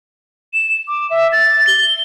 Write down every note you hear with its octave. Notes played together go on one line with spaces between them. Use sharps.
E7
D6
E5
A6
G7